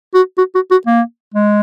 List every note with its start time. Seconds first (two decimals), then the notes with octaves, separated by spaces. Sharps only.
0.14 F#4
0.38 F#4
0.55 F#4
0.71 F#4
0.87 A#3
1.34 G#3